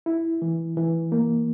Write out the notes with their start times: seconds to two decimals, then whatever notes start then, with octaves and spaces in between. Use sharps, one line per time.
0.06 E4
0.42 E3
0.77 E3
1.12 A#3